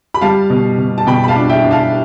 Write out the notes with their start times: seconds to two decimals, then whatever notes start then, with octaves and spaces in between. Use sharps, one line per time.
0.14 B5
0.21 G3 F5 A5
0.50 B2
0.78 B2
0.98 A5
1.07 B2 G5 B5
1.24 B5
1.28 F5 A5
1.36 D4
1.49 E5 G5
1.64 D4
1.71 F5 A5